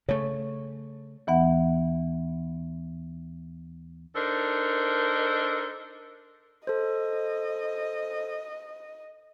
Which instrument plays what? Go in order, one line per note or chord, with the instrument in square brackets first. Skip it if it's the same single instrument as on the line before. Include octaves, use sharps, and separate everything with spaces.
[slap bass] C#3 A3 [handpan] C#5
[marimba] D#2 E3 B3 F#5
[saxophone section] D4 D#4 A4 A#4 C5
[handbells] A4 C5 [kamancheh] D#5